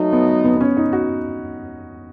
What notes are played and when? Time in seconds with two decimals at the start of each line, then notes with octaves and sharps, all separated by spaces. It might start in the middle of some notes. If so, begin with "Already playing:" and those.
Already playing: F#3 A3 D#4
0.13 B3
0.45 B3
0.56 B3
0.61 C#4
0.77 D#4
0.93 F#4